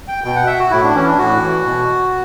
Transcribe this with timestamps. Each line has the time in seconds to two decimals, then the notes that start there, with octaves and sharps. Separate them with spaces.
0.08 G5
0.24 B2 G5
0.36 F#5
0.47 E5
0.59 F#4
0.71 A2 E4
0.83 D4
0.95 E3 C#4
1.06 D4
1.18 A2 F#4
1.42 E3
1.66 B2